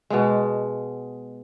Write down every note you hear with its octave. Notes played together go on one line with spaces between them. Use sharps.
B2 G#3